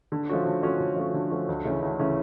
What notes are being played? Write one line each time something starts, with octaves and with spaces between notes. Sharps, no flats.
D3
F3 A3 C#4 F#4
D3
F3 A3 C#4 F#4
D3
F3 A3 C#4 F#4
D3
F3 A3 C#4 F#4
D2
C#3 E3 A3 C#4
D2
C#3 E3 A3 C#4